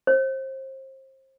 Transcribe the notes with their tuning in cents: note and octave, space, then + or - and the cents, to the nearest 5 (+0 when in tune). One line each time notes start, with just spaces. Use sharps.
C5 +30